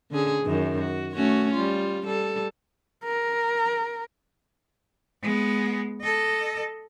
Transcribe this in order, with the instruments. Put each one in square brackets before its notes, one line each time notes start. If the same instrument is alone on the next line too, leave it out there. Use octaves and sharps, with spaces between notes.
[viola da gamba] D3 C#4 G#4
F#2 D#3
F#4
A3 C#4 F#4
G3 F4
G3 A4
[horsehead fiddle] A#4
[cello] G#3 B3
A4 D#5